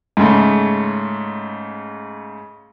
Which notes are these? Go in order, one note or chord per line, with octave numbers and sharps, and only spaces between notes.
G#2 C#3 A3